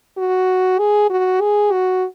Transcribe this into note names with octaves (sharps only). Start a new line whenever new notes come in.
F#4
G#4
F#4
G#4
F#4